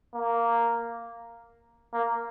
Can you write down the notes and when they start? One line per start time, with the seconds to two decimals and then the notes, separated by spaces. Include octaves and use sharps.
0.14 A#3
1.93 A#3